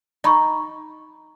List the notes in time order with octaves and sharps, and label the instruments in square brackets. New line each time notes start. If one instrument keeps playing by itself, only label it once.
[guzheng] D#4 [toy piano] D#5 B5 C#6